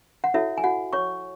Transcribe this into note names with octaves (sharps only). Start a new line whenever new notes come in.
F#5
E4 F#4 A4 C#5 E5
G#5
F#4 F#5
C#5 C#6